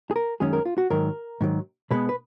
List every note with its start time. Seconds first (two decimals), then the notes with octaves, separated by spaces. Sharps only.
0.11 G#4
0.16 A#4
0.40 F#2 D#3 G#3 C#4 G#4
0.53 A#4
0.65 F4
0.78 F#4
0.90 G#2 D#3 F#3 A#4
1.41 G#2 D#3 F#3
1.91 B2 G#3 B3 B4
2.09 B4